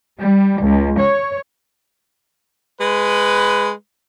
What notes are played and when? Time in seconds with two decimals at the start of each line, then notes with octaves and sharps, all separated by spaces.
0.18 G3
0.61 C#2
0.99 C#5
2.80 G#3 B4